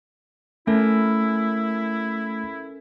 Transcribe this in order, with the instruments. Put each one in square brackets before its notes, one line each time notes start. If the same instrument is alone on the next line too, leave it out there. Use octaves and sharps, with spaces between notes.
[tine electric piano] A3 [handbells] C#4 A4 A#4 [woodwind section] E4